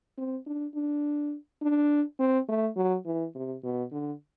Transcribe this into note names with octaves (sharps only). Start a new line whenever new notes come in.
C4
D4
D4
D4
C4
A3
F#3
E3
C3
B2
D3